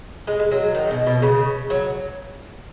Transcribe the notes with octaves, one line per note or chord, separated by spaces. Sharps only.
G#3
G#3
F#3
D#3
B2
B2
C#3
F#3